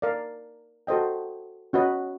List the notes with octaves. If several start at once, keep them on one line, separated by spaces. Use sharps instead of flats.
A#4 D5 F5
F#4 A4 C5 D#5 G5
C#4 F#4 B4 D#5